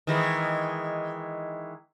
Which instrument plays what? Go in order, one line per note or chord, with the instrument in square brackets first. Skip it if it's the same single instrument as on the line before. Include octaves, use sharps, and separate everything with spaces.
[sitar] D#3 E3 G#3